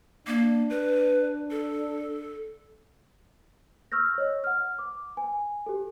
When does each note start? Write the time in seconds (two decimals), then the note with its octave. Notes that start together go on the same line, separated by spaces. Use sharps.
0.27 A#3 D4
0.70 B4
1.51 A4
3.92 C#6 E6 F6 G6 A#6
4.18 C#5 D#5
4.44 F#5 F6
4.79 D6
5.17 G#5
5.66 G4 A4